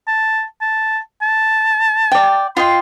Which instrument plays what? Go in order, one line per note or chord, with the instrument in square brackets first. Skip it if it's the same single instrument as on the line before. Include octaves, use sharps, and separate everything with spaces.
[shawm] A5
A5
A5
[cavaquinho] D5 G5
[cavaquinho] F4 D#5 G5 [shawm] C6